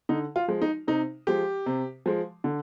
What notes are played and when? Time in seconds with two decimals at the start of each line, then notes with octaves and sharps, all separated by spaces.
0.09 D3 D#4
0.36 F4
0.48 F3 G#3
0.62 D#4
0.88 C3 D#4
1.27 F3 G#3 G4
1.66 C3
2.06 F3 G#3
2.44 D3